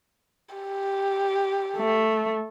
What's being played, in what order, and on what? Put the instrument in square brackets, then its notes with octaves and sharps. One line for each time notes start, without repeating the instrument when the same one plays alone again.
[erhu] G4
[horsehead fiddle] A3